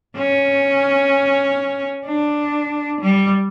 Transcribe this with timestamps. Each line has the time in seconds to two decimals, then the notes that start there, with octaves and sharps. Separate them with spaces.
0.16 C#4
2.06 D4
3.00 G3